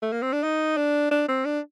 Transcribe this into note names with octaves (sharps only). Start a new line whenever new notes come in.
A3
A#3
C4
D4
D#4
D4
D4
C4
D4